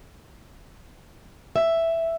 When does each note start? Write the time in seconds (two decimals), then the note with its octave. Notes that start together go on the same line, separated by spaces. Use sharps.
1.56 E5